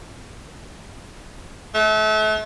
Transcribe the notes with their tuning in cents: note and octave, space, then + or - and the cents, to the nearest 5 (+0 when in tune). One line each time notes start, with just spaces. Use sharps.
A3 -35